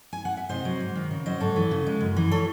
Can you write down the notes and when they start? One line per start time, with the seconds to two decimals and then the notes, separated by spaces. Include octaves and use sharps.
0.13 G#5
0.25 F#5
0.37 E5
0.49 C3 C5 D#5
0.65 F#3
0.80 G#2
0.95 D#3
1.11 C#3
1.26 F#3 C5 D#5
1.40 G#2 A4 C#5
1.56 E3
1.71 C#3
1.87 G#3
2.01 F#2
2.17 E3
2.31 A4 C#5